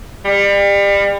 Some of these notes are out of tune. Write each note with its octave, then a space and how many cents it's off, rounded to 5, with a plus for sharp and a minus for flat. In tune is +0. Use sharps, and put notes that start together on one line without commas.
G3 +35